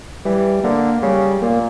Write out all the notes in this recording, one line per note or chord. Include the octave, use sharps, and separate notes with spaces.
E3 G3
D3 A#3
C#3 G3
A#2 A#3